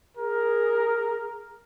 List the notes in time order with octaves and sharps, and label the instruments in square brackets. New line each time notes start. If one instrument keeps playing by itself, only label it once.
[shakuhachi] G#4 [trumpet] A#4